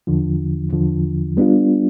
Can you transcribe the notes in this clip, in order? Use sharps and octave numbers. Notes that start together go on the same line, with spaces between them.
E2 D3 F3
E2 D3 F3
G3 B3 D4 F4